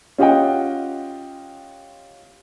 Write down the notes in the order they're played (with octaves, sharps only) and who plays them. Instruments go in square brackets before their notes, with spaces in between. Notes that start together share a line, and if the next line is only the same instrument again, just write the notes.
[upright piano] C#4 F4 G4 D#5 F#5 G5